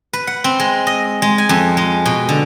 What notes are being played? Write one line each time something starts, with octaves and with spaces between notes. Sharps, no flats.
B4
F#5
C4
G#3
D#5
G#3
G#5
F2
G#3
B2
D3